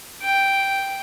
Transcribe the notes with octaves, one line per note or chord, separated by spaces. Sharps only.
G5